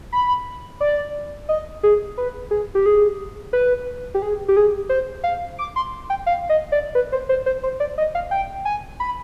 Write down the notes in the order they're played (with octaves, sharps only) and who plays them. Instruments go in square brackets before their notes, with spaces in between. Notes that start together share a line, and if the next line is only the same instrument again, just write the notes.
[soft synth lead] B5
D5
D#5
G#4
B4
G#4
G4
G#4
B4
G4
G#4
G4
G#4
C5
F5
D6
C6
G5
F5
D#5
D5
B4
C5
C5
C5
C5
D5
D#5
F5
G5
G#5
B5